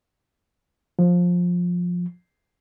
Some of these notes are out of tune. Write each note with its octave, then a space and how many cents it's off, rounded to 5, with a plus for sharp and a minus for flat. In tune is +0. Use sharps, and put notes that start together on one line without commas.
F3 +15